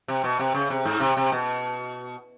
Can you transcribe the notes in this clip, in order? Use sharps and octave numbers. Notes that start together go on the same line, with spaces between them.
C3
B2
C3
C#3
C3
G#2
C3
C3
B2